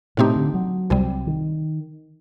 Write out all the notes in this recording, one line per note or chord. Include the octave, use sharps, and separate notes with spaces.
A2 C3 A3 C4 D#4 G4
D3
F#3
C2 C3 G3
D#3